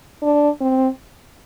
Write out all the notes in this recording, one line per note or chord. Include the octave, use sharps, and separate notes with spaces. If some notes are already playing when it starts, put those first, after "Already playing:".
D4
C4